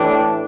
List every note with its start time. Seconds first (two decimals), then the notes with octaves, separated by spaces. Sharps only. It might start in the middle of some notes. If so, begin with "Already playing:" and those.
Already playing: A2 E3 D4 G4